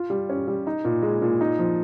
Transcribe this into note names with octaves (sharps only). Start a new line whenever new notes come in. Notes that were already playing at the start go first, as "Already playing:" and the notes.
Already playing: F4
G3
C#4
G3
D#4
A#2
G#3
A#2
D#4
F3